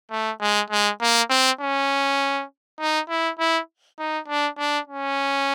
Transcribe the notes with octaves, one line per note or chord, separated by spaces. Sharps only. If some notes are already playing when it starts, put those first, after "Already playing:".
A3
G#3
G#3
A#3
C4
C#4
D#4
E4
E4
D#4
D4
D4
C#4